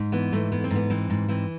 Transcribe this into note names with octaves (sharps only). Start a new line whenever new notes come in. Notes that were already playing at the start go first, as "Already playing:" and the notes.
Already playing: G#2
E3 B3
G#2 A3
E3 B3
C4
G#2
B3
E3 C4
G#2
E3 C4